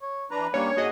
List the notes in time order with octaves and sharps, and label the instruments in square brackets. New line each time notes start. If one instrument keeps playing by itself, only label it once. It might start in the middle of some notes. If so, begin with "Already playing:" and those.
[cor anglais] C#5
[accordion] E3 D4 A#5 [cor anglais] B4
[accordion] G3 A#3 [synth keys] C#4 D4 [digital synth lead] C#5
[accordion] G#2 [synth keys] A#3 F#4 D#5 [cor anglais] G#4